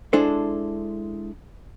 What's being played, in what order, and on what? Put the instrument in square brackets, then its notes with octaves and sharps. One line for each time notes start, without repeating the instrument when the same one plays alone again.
[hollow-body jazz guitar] G#3 D4 E4 A4 C5